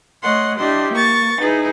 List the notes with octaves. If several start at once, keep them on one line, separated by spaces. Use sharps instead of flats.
A3 C#5 D#5 F#5 C6
D4 E4 G4 D#5 C6
A#3 C#6 A6
D#4 E4 G#4 B4